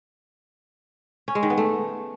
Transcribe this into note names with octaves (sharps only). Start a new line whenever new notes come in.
C#4
G#3
D#3
B3
A3